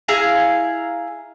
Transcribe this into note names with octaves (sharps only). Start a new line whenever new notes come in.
E4 G#4 F5 A#5